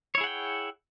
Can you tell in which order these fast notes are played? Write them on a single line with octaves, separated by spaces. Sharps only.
C#5 E4 G#4 F#5 G5